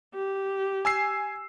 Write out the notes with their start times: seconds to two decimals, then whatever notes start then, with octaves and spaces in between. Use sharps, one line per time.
0.14 G4
0.85 G#5 E6 C7